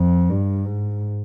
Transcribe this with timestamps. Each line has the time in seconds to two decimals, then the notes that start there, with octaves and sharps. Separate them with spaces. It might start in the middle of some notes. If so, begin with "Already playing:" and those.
Already playing: F2
0.30 G2
0.66 G#2